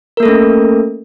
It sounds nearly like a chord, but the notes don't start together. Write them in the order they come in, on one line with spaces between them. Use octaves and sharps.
A#4 A#3 A4 A3 C#4